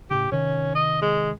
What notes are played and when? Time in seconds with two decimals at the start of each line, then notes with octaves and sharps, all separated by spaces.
0.10 A2 C#3 G4
0.32 C3 D#3 C#4
0.75 D#5
1.02 G#3